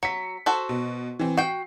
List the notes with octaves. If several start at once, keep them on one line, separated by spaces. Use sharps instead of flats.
F#3 B6 C#7
F#4 A4 C5
B2
E3 C4
F#4 G5 C7